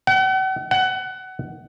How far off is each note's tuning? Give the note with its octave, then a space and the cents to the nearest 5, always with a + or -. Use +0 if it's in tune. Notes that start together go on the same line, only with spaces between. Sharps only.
F#5 +40
F#5 +20